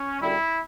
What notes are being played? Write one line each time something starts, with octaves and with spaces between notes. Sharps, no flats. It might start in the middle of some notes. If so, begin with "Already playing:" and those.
Already playing: C#4
F#2 D3 G3 E4